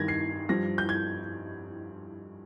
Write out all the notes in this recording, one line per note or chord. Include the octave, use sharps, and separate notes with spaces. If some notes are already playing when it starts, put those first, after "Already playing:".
Already playing: G2 D#3 G#6 A#6
C7
G2 F3 A#6
G6
G#6